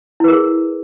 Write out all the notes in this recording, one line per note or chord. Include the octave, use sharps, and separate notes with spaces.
E4 G#4 A#4 B4